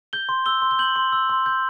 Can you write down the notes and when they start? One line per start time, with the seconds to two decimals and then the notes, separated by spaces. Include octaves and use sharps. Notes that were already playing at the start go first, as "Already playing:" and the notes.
0.13 G6 G7
0.29 C6
0.46 E6 G7
0.62 C6
0.71 G7
0.79 G6 F#7
0.96 C6
1.12 E6
1.29 C6
1.46 G6